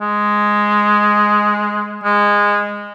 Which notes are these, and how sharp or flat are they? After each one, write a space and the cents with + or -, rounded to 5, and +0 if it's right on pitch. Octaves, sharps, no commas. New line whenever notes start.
G#3 +0
G#3 -15